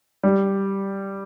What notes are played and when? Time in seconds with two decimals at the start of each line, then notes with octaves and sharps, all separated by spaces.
0.23 G3